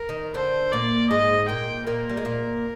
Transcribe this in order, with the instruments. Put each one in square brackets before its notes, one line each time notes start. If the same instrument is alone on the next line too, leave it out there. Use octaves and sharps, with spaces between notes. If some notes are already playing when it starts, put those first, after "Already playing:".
Already playing: [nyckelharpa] A#4
[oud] D#3 D#4
[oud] D3 D4 [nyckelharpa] C5
[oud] A#2 A#3 [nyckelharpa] D5
[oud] G#2 G#3 [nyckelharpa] D#5
[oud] A#2 A#3 [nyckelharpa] G5
[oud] A#2 A#3 [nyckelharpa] A#4
[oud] G3
G#3
A#2 A#3